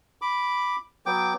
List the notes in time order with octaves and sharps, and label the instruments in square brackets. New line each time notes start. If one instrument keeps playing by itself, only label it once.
[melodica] B5 D6
F#3 B3 G5 D6